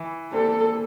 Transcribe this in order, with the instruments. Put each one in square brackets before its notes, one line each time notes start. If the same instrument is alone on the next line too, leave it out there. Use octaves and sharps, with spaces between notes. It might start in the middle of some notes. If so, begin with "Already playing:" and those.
Already playing: [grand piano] E3
[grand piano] A#3 D4 G4 C5 [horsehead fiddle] A4